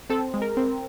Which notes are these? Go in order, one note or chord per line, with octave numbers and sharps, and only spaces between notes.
C4 A4
G#3
A#4
C4